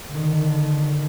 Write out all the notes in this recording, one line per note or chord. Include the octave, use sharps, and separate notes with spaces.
D3 D#3